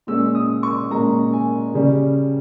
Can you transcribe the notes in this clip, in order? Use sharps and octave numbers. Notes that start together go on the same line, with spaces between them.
A#2 G#3 C#4 E6
D#6
C#6
A#2 G#3 C#4 A#5
G#5
C#3 G3 C#4